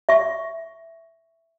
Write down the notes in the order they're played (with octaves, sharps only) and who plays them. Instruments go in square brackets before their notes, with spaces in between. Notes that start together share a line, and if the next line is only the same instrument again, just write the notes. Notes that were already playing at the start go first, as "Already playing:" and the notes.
[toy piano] E5 C#6